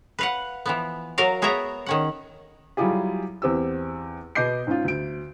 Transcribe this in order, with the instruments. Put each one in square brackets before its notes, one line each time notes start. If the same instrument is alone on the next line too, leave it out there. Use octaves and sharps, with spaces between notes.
[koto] B4 F5 F#5
E3 F3 B3
F#3 A#4 F5
B3 G#4 A#4 C#5 E5 A#5
D#3 C#4 F#5
[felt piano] F#3 G3 E4 F4 G4 G#4
E2 C4 G4 E6
B2 B3 D#5 D6 G6 C7
G#2 C#4 F4
D2 D7